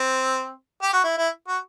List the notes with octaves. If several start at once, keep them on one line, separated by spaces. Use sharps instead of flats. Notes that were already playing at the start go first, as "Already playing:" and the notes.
Already playing: C4
G4
F#4
E4
E4
F#4